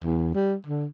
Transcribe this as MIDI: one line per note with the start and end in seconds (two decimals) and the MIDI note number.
0.04 0.32 40
0.34 0.55 55
0.67 0.86 50